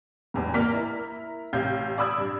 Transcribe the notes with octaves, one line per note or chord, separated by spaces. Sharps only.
A1 E2 G#2
A#3 D5 F6 B6
E4 A#4
A1 C3 F5 G6 G#6
D5 B5 D#6 E6 G#6
G2